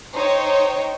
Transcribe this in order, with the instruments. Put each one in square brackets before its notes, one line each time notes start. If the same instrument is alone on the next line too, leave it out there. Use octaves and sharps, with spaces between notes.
[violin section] D#4 C5 C#5 G5